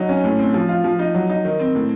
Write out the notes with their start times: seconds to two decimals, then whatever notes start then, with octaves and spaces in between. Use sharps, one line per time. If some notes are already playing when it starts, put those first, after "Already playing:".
Already playing: F#3 D#4
0.09 C#4
0.24 A2
0.39 C4
0.54 F3
0.69 F4
0.84 F3
0.99 D#4
1.15 F#3
1.30 D#4
1.45 D#3
1.59 C4
1.75 A2